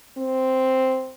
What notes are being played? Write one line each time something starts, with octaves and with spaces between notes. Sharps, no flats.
C4